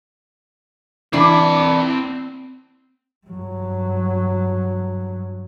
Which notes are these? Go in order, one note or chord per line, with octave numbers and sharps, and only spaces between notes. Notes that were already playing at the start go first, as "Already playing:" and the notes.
E3 C4 D4 B5
G2 F#3